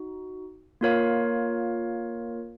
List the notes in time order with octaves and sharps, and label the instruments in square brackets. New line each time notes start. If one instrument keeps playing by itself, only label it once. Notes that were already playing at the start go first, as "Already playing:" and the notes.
Already playing: [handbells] D#4 F#4
A#3 F4 A#4 C#5 F5